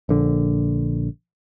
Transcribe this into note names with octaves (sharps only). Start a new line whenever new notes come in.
A#1 D3